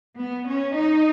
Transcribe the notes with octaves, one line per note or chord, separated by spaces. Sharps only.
B3
C#4
D#4